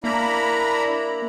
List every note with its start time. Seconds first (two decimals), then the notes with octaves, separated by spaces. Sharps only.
0.04 A#3 D4 E4 A#5 B5